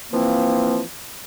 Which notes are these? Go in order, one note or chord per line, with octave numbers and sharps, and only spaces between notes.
E3 F3 A#3 C4